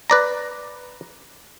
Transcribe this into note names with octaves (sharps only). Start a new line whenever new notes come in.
B4 D5 A#5